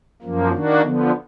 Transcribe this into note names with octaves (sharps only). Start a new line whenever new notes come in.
F#2 F3 A#3
D#3 A#3 D4 F#4
D3 F3 B3